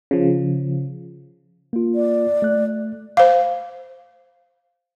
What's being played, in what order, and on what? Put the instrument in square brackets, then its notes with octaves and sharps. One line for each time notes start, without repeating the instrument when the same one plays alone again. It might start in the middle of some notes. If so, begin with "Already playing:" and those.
[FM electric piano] C#3 F3
[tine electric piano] A#3 F4
[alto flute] D5
[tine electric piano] A3 F#6
[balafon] C5 F5